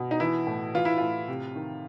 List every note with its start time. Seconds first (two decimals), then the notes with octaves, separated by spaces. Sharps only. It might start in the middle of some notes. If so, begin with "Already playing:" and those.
Already playing: B2
0.11 D#4
0.20 E3 E4
0.47 A2
0.74 E3 F4
0.85 E4
0.98 A2 F4
1.28 C3
1.56 D#3